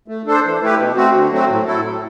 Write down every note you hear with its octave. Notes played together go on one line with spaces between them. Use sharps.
A3
D4 A4 C5
E3
A3 E4 G4 B4
B2
A3 C4 F#4
D3
F#3 A3 C4 F#4
A2
F#3 A3 E4 A4
A2